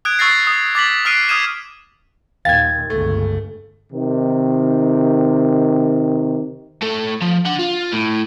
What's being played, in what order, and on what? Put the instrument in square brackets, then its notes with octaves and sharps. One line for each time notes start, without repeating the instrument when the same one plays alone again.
[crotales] D#6 F#6 G#6 D7
C#6 E6 F#6 A6 A#6 C7
D#6
D6 A6 B6 F#7
D#6 F6 F#6 C7 D7 D#7
D#6 F6 G#6 D#7 E7
[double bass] D#2 A#2 [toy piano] F5 G5 [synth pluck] G#6 A6
[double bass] G1 C#2 [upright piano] A3
[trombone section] C3 D#3
[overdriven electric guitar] A2 A4
F3
D4 F#5
F4
A2